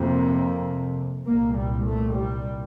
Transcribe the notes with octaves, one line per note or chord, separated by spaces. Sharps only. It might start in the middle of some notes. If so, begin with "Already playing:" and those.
Already playing: F2 C3 A#3
C2 A#2 A#3
G3
A3
G3